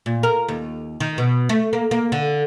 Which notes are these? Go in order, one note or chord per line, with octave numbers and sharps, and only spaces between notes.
A#2
A#4
D#2
D#3
B2
A3
A#3
A#3
D3